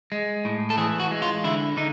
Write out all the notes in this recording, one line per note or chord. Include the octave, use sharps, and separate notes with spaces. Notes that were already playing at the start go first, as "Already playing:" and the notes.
G#3
A2
A4
E3 G#4
F#4
G#3
F4
D3 E4
D3 D#4